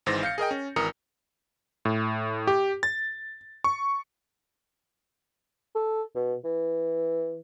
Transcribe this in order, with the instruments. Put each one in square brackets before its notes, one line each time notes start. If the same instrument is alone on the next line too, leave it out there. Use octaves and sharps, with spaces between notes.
[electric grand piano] G#1 G#2 E3 C5 A6 A#6
F5 G6 C#7
G#4 A#4 D#5 G5
C#4
G#1 E3 A#4 A#5 D#6 C#7
A2
G4
A6
C#6
[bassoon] A4
B2
E3